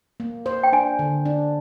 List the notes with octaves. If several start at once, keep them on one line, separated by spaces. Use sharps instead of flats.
A#3
C5
G5
D4 G#5
D3
D4